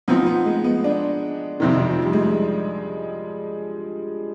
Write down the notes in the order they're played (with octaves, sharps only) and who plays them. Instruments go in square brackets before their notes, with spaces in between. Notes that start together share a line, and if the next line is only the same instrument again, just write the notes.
[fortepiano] F3 C4 D#4 [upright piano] B3
[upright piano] B3
G#3
B3
D4
[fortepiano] F2 C3 D#3
[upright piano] F3
G3
G#3